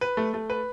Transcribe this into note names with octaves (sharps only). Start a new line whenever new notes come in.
B4
A3
A3
B4